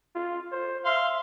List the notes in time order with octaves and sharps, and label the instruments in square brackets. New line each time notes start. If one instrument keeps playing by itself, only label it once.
[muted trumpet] F4
C5
[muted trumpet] E5 [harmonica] F5 C6